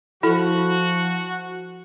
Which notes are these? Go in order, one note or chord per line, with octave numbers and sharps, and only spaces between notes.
F3 E4 F#4 A4